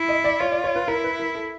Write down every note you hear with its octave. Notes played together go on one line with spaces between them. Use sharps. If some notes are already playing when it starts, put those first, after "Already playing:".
Already playing: E4
D#5
D5
F4 C#5
D5
C#5
B4
E4 A#4
B4
A#4
A4